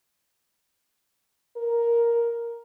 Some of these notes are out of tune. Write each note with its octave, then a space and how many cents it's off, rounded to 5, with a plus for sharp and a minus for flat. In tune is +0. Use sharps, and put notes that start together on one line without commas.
A#4 +5